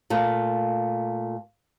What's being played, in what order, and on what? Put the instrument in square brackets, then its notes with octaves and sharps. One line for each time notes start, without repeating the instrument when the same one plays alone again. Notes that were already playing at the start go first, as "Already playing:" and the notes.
[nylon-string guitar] A#2 A3 F5